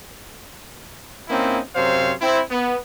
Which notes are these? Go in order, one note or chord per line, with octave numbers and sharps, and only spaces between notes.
A#3 C4 C#4 D#4 E4
F#2 C3 C5 C#5 F5
C4 E4
B3